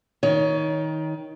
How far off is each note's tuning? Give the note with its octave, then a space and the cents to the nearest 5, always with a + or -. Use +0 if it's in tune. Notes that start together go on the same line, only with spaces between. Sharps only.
D#3 +20 C#5 +20